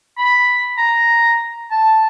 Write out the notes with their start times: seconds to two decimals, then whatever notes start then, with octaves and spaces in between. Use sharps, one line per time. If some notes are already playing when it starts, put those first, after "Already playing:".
0.18 B5
0.78 A#5
1.71 A5